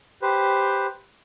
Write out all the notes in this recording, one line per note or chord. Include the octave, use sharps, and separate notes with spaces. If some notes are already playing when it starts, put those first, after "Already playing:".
G4 B4 C5